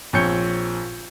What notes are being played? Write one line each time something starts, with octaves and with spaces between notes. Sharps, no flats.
A#1 C4 C#5 G6 C#7